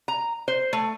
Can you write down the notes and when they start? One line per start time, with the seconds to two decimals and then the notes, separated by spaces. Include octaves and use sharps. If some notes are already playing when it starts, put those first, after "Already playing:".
0.08 A#5
0.48 C5
0.73 A3